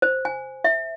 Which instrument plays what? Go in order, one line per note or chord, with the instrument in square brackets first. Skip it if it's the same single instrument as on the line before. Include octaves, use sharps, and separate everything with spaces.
[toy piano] C5
G#5
E5